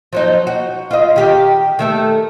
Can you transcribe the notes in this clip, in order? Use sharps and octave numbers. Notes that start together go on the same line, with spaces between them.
F3 F#3 D#4
F#4
F4 D#5
D#3 G4
D#3 A3 A4